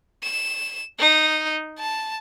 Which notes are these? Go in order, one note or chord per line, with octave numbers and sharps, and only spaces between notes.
E7
D#4
A5